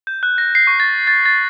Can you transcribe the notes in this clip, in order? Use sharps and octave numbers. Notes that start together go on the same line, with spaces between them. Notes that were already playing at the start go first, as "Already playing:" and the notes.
G6
F#6
A#6
C7
C#6
A6
A6
A6